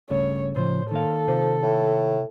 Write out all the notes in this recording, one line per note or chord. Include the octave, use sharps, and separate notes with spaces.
D1 G2 C#3 A3 C#5
A2 C#3 F3 C5
D#3 A#3 A4 F5
C3 F3
A2